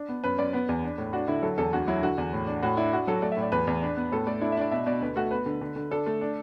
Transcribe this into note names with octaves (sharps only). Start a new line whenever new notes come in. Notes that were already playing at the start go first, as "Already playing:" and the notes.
Already playing: D4
B3
F#2 B4
F#2 D5
B3 B4
E2
D4
A2
D4 F#4
D3 E4
F#3 A4
E2 A4
D2 F#4
F#3 E4
D3 F#4
E2
A2
D4
A2 F#4
D4 E4
D4 F#4
F#3 A4
A3 D5
E5
A2
D5
E2 B4
E2
D4
B3
A2 A4
A3 D5
D4 E4
E5
D4 D5
B2 E5
B2 D5
D2 B4
A3 F#4
B3 B4
D3
D3
D3
D4 A4
A3
D4